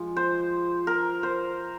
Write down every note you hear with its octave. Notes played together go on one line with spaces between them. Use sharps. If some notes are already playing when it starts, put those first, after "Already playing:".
Already playing: F3 G#3
C5
A#4
C5